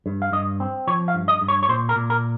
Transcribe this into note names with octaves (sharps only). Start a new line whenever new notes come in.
G2
F5
G2 D#5
C4
F3 C#5
F5
G2
D#5
G2
C#5
C#5
A#2 C5
A#4
A#2
A#4